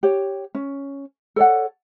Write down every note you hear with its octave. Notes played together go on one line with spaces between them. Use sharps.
G4 C#5
C#4
A4 C#5 D5 F#5